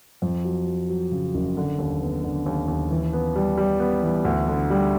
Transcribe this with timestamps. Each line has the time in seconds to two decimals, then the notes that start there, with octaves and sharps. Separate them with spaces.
0.22 F2
0.45 F#3
0.66 F#3
0.89 F#3
1.12 C#3
1.34 F#1
1.57 D3
1.79 D#2
2.01 B3
2.24 D3
2.46 D#2
2.68 D#2
2.90 E3
3.13 B3
3.36 G3
3.57 G3
3.80 B3
4.03 E3
4.25 D2
4.48 D3
4.70 G3